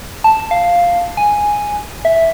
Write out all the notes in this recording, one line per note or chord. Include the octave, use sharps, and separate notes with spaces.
A5
F5
G#5
E5